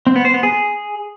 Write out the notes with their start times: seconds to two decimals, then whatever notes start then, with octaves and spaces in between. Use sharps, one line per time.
0.07 C4
0.16 B3
0.25 C5
0.34 B3
0.43 G#4